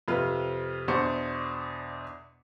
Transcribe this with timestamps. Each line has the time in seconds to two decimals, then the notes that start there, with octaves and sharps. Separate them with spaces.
0.08 F2 C3 F4 B4 F6
0.88 E2 B2 D4 C5 C#6 C#7